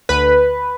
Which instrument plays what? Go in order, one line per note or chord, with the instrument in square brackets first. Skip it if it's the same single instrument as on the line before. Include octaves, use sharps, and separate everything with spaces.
[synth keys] D2 B4